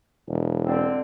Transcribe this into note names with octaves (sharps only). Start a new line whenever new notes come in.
E1
D3 C4